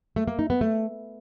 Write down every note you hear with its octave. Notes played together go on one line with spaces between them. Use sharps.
A3
A#3
D#4
B3
A3